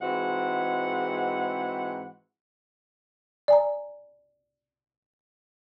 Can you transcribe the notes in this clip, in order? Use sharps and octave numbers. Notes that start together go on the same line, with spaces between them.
G#2 E3 G#3 C4 F#4 F#5
D5 G#5 A#5